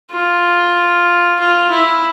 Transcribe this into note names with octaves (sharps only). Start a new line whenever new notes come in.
F4
F4
E4